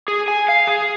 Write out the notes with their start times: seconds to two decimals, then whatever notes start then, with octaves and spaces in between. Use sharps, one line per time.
0.08 G#4
0.28 G#5
0.48 F5
0.67 G#4